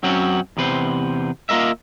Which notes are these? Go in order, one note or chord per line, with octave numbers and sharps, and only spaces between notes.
F#2 F#3 C4 C#4 F#4
E2 C3 B4 C5
A#3 F4 A#4 D#5 E5